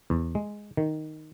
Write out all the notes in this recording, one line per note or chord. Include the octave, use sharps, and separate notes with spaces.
E2
G#3
D#3